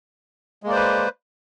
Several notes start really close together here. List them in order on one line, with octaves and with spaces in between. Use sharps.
G#3 A#3 D5 C5 B4